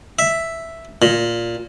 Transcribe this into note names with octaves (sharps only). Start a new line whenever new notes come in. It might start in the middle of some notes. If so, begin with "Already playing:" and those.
E5
A#2